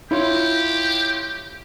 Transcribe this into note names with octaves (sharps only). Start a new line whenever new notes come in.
E4 F4 G4 C#5